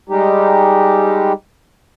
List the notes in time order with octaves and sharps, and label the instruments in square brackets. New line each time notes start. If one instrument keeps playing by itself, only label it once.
[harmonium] G3 G#3 D#4 G4